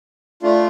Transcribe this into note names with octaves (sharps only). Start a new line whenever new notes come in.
A3 D4 F4